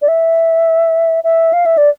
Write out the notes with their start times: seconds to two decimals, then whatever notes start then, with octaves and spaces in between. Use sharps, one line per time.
0.02 D5
0.08 E5
1.24 E5
1.53 F5
1.66 E5
1.77 D5